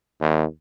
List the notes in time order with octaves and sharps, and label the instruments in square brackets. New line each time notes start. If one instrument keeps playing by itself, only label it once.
[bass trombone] D#2